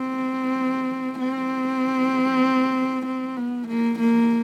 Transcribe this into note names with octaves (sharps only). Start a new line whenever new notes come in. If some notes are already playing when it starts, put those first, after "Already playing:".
Already playing: C4
C4
C4
B3
A#3
A#3